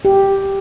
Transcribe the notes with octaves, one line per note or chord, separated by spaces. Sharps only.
G4